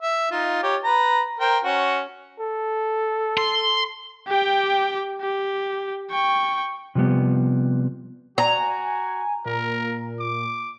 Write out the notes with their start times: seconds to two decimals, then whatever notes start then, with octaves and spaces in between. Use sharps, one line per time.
0.02 E5
0.31 D#4 F4
0.63 G4 C#5
0.84 B4 A#5
1.40 A#4 C5 G5
1.65 C#4 F#4
2.40 A4
3.37 C6
4.27 G4 G5
5.21 G4
6.10 G5 C#6
6.95 C3 F3 G3 B3
8.38 F#4 G#5 A#5
9.46 A#2 A#4
10.20 D6